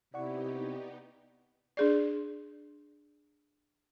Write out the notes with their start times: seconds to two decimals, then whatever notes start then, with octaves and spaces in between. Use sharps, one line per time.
0.14 C3 B3 D#4 E4 G4 D5 F#5 C#6
1.77 D4 G#4 D5